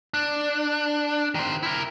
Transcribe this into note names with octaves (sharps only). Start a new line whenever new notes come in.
D4
D#3 C5
E4 A#4